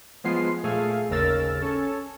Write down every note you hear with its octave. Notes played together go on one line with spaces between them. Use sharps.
F3 G#3 B3 F4 C7
A#2 A3 G#4 F5
G#1 D#2 C#3 A#4 E6 A6
C#4 A4